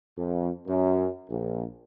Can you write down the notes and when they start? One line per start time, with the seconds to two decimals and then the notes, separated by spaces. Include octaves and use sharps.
0.17 F2
0.67 F#2
1.29 A#1